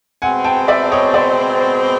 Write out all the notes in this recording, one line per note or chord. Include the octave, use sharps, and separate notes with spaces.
B2 G#3 C4 F#5 G#5
G5 A5
D5 E5
C#5 D#5
C5 D5